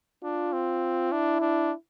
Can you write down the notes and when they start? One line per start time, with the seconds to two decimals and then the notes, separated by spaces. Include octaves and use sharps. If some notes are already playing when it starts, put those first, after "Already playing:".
0.23 D4 F4
0.53 C4
1.12 D4 E4
1.41 D4